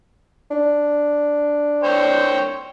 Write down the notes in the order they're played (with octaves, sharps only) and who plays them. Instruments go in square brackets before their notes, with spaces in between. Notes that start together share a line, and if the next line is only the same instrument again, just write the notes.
[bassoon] D4
[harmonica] C5 C#5 G5